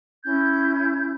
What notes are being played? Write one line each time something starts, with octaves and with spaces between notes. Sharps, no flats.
C#4 E4 G6 G#6